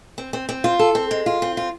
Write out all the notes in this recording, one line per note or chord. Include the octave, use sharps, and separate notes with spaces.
C4
C4
C4
F4
A4
C4
G#3
F4
C4
F4